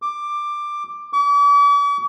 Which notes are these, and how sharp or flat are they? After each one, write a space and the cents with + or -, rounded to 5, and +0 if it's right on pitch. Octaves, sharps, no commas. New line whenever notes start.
D6 +10
D6 -45